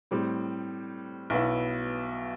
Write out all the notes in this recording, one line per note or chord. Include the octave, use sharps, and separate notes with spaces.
A2 G3 C4
B1 B2 B3 E4